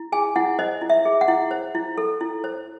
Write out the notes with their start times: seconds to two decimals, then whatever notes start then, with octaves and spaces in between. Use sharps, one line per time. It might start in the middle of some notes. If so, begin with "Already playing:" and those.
Already playing: E4
0.12 G#4 G#5
0.36 E4 F#5
0.59 C5 D#5
0.81 E4
0.90 E5
1.05 G#4
1.21 F#5
1.28 E4
1.51 C5
1.75 E4
1.98 A4
2.21 E4
2.44 C5